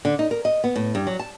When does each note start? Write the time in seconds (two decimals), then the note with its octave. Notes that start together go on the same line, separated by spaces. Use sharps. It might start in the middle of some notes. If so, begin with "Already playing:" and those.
0.05 D3
0.19 D#4
0.31 A#4
0.45 D#5
0.64 B3
0.76 A2
0.95 G2
1.07 F#3
1.19 A5